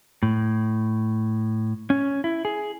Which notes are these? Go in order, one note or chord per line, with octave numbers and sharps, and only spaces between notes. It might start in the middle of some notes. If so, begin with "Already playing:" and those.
A2
C#4
E4
G#4